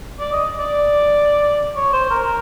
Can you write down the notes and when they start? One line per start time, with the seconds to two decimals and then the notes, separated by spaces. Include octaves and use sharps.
0.20 D5
0.32 D#5
0.59 D5
1.76 C#5
1.93 C5
2.11 A#4